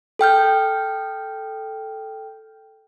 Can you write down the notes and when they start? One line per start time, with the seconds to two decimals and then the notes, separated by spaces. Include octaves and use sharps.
0.19 A4 G5 F6 G6